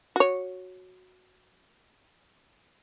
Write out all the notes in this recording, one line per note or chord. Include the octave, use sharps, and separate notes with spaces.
F#4 C#5